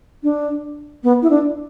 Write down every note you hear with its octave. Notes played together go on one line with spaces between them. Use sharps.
D4
B3
E4
D4